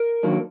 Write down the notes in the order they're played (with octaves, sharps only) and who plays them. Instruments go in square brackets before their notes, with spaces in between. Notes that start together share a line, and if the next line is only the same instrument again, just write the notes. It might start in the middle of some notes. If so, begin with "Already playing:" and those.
Already playing: [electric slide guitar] A#4
D#3 F#3 A#3 D4